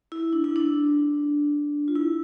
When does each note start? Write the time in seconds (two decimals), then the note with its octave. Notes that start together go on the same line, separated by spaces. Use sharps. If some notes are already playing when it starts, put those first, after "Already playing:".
0.12 E4
0.33 D4
0.44 E4
0.56 D4
1.88 F4
1.95 E4